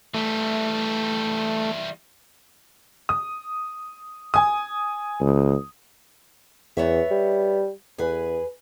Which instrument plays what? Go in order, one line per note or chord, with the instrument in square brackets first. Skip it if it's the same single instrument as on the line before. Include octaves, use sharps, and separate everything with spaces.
[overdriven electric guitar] E3 G3 [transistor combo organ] A3
[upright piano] D#6
G#5 D#6
[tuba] C#2
[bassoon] E2 [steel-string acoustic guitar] B3 C#5 E5
[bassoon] G3
[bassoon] E2 [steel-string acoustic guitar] G#4 B4